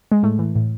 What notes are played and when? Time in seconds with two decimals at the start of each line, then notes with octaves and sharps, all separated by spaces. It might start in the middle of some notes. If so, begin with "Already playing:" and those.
0.12 G#3
0.23 A2 A3
0.39 E3
0.55 A2